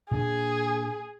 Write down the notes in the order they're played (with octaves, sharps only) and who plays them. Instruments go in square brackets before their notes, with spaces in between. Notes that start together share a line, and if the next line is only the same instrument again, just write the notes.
[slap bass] A#2 D4 [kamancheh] G#4